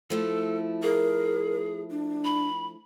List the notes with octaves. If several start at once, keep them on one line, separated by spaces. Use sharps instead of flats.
F3 A3 E4 A4
G#4 A#4
D4
B5